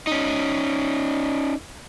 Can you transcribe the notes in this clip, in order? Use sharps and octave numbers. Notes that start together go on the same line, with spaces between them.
C#4 D#4